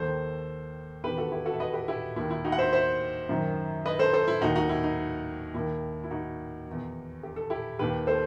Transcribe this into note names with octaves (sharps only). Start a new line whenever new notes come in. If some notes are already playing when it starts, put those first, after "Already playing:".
Already playing: D#2 D#3 A4 C5
E2 D#3 G4 B4
F#4 A4
E4 G4
F#4 A4
E5
B4 D#5
G4 B4
E4 G4
D#2 D#3 E4
E4
D#4 F#4
F#5
C5 E5
C5 E5
F#2 D#3
B4 D#5
A4 C5
A4 C5
E4
D#2 D#3 D#4 F#4
D#4 F#4
E4
D#4
D#2 D#3 E4
E4
D#4 F#4
E2 D#3
G4
A4
E4 G4
D#2 D#3 G4 B4
A4 C5